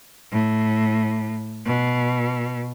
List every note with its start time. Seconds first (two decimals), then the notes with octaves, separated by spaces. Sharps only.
0.32 A2
1.65 B2